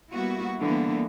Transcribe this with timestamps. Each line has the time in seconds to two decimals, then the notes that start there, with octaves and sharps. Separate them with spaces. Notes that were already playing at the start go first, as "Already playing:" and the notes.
0.12 G3 A#3 B3 E4 F#4
0.60 D3 E3 G3 A#3 B3